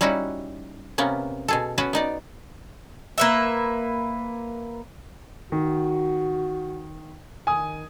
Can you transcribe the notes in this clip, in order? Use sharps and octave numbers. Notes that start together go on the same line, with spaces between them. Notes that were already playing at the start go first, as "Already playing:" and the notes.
G3 C#4 D#4 E4 F#4
C3 A#3 B3 C#4
B2 G#4 A4
B3 C#4 F#4 B4
B3 D#4 D5
A#3 B4 E5
D#3 F#4
D#3 G#5 D#6